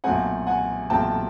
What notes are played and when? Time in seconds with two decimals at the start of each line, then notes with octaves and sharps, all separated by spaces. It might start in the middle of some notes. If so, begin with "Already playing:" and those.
0.04 B1 A#2 F#3 A3 C4 F#5 G#5
0.47 F#5 G#5
0.90 B1 A#2 F#3 A3 C4 G5 A5